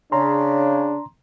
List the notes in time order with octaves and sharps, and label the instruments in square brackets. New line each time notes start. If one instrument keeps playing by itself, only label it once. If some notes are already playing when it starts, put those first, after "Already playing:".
[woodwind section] C#3 [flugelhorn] D4 [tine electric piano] A#5 C6